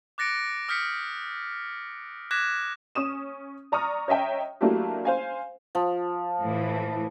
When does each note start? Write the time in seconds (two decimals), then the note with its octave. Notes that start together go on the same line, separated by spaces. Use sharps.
0.18 D6 F#6 A6 A#6 C#7 D7
0.68 D#6 F6 G6 B6 C#7
2.31 D6 F#6 G#6 A#6 B6 E7
2.95 C#4 D#6 E7
3.72 D5 A#5 C#6 D#6 F6
4.08 C#5 D#5 E5 G5 A#5
4.61 F#3 A3 A#3 D4 E4 G4
5.05 C5 F5 G#5
5.75 F3
6.40 A2 E3